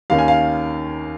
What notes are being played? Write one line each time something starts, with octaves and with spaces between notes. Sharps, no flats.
D#2 D#3 C#4 F5
G#5
F5